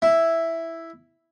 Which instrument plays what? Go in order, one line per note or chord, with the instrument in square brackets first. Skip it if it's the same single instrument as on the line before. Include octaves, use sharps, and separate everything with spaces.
[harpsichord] E4